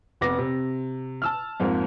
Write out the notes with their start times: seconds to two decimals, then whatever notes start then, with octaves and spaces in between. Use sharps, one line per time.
0.21 F1 B3 D6 A#6
0.38 C3
1.22 A5 E6 F6
1.60 F2 G#2 F3 A#3